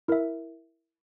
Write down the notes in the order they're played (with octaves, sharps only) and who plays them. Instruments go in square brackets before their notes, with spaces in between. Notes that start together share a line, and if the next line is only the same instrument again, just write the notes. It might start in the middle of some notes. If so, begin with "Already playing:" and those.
[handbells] E4 A#4 E5